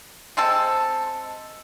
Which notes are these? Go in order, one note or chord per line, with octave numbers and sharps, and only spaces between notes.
G#3 C4 A4